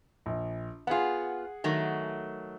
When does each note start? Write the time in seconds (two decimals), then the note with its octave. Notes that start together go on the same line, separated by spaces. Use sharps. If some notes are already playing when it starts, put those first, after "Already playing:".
0.26 A#1
0.87 B3 F4 G#4 F#5
1.64 D#3 F#3 A3